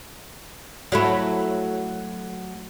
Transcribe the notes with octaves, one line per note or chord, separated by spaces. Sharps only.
F#3 A3 E4